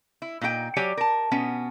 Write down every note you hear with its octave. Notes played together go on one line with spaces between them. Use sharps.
E4
A#2 D#4 F4 G5
F#3 G4 C#5 D5 G#5
A#4 A5
B2 B3 C#4